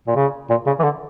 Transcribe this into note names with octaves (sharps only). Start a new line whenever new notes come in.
A#2
C#3
A#2
C#3
E3
D3